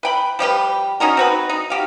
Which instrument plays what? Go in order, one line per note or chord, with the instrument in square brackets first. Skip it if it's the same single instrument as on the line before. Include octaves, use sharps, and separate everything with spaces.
[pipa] B4 G5 B5
F3 G3 G4 B4
C#4 D#4 F#4 A#4
C4 F#4 B4
D#4
F#4 G4 F5